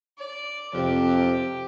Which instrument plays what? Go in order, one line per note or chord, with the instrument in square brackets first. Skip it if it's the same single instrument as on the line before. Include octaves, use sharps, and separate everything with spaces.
[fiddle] D5
[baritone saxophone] F2 [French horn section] C3 [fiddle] G4